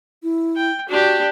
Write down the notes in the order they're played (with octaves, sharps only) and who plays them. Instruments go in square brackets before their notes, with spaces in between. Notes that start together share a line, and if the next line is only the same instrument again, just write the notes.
[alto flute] E4
[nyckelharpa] G5
[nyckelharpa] D4 G4 [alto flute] F#4